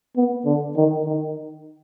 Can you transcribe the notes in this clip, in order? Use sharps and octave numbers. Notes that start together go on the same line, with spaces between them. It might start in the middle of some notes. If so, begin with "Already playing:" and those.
B3
D3
D#3
D#3